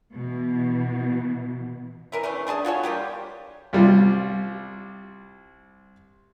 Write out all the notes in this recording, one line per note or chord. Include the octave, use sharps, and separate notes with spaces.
B2 E3
E3 A#4 E5
E3 A3 C#4 C5
A3 D4 G#4 A5
F4 F#4 A4 C#5
G3 A#3 F4 G4
C2 G3 F4